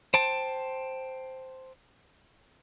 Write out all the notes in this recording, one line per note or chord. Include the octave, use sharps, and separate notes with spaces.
C5 G5 A5